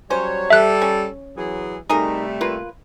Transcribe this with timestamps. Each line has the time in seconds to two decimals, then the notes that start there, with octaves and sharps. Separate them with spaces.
0.10 F#3 G3 C#4 C5 C#5
0.50 G3 A4 E5 F#6
0.82 C#4
1.37 E3 F#3 G#4
1.89 C3 G3 A3 D#4 G#4 A#4
2.41 A#3 F4 B4